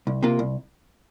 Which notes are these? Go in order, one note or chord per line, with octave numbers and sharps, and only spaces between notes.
C2
C3 A#3 F4
C2